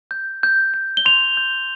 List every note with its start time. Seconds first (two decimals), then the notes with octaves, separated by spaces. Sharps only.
0.11 G6
0.43 G6
0.74 G6
0.97 G7
1.05 C6 F7
1.37 G6